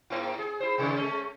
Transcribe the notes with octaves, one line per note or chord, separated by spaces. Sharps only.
G#2 A#3 E4
G#4
E4 C5
C3 D#3 G#3
G#3 A3 C#4